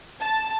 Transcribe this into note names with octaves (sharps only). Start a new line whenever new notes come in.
A5